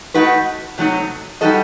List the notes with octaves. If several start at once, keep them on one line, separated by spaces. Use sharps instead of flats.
A3 D#4 F#4 B4
C3 F#3 A3 D#4
G3 D#4 F#4 A4 D#5